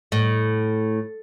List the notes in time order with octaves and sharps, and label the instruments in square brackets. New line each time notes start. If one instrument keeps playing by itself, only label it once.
[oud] A2